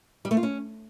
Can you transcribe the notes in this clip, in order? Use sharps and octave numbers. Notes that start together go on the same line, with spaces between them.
G3
A3
F4
C#4